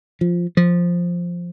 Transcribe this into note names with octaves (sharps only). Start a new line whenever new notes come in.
F3
F3